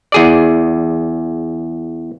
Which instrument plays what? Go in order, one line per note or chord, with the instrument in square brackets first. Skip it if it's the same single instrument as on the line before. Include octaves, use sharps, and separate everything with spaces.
[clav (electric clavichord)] E2 G#4 D5